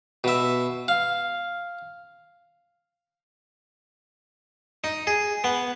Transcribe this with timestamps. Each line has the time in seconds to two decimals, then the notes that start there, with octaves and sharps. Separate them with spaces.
0.24 B2 E5
0.88 F5
4.84 D#4
5.07 G#4
5.44 B3